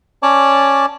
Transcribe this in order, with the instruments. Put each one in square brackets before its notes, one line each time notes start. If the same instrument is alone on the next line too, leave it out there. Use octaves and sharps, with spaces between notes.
[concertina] C#4 C#5 D5 A5 D6